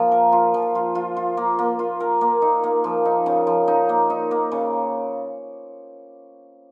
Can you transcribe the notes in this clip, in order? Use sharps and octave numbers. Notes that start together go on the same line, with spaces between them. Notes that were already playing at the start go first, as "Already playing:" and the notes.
Already playing: F3 A#3 F4
A#4
F4
F3
F4
F4
F4
A#3
A#3
F4
A#4
A#3
D#4
A#3
F3
D#4
C#3
F3
D#4
A#3
D#4
A#3
C#3